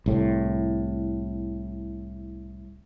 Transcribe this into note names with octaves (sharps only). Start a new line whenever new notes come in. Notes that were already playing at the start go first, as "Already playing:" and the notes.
C2 A2